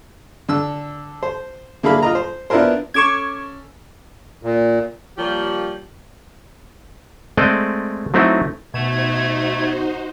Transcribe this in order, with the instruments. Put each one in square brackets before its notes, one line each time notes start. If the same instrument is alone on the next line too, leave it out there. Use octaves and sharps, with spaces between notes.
[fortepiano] D3 E6
C5
D3 A#3 E4 G#4 F5 B5
F4 D#5 A#5
C5
B3 D4 E4 F4 A#4 C5
[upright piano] C#4 A4 E7 [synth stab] C#6 D6 G#6
[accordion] A#2
[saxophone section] F3 G3 A#3 G4 C#5
[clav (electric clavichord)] G#3 A3 C4 A4 D5 D#5
F#3 A3 C4 D#4 E4
[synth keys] B2 E7 [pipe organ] A3 G#6 [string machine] D#4 F#4 C5